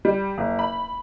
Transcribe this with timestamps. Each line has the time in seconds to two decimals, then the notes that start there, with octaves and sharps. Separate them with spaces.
0.05 G3
0.38 F#1
0.59 B5